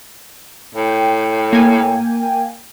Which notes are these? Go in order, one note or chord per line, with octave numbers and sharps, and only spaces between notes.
A2 G5
A#3 G#5